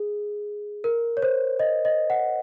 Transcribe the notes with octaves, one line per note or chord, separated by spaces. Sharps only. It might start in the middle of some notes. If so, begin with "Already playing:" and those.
Already playing: G#4
A#4
C#5
C5
D#5
D#5
F#5